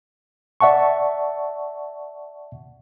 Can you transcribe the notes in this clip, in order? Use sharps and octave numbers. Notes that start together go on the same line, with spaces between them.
D5 E5 F#5 A5 C#6